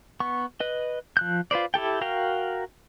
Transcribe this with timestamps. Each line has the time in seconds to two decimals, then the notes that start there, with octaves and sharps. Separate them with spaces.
0.20 B3 C#6
0.60 B4 D#5
1.17 F3 F#6 G6
1.51 F4 B4 C5 D5
1.74 E4 G4 A4 G5
2.01 F#4 A#4 F5 G5